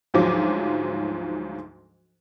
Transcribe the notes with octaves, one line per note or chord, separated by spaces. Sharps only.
D2 G#2 F3 F#3 D6